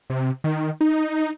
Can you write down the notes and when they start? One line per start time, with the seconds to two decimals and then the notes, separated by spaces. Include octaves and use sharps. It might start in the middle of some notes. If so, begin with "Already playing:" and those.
0.10 C3
0.44 D#3
0.81 D#4